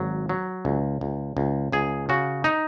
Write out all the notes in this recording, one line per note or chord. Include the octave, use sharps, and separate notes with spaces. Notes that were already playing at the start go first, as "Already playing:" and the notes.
Already playing: G#1 F#3
F#3
C#2
C#2
C#2
C#2 G#4
C#3 F#4
D#4